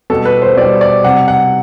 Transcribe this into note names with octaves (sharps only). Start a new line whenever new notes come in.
B2 G3 A4
B4
C5
B2 G3 D5
D5
C3 G3 F#5
F#5